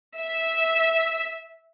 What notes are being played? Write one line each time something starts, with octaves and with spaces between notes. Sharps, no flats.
E5